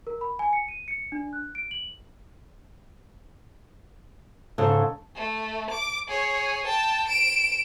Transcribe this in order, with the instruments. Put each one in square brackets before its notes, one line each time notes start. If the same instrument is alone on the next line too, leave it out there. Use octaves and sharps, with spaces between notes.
[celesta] A#4
B5
G#5
C#7
D#7
C#7
D4
F#6
D7
F#7
[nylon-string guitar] G#2 C#3 [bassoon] A4
[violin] A3
D6
G#4 C#5
G5 A5
D7 E7